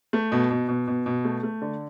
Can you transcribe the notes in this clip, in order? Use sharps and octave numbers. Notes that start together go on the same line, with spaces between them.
A3
B2
B2
B2
B2
B2
A3
A3
D3